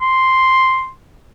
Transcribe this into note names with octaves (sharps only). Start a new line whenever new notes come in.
C6